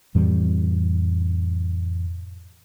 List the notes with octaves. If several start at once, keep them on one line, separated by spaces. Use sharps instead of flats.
F2 A2 E3 G3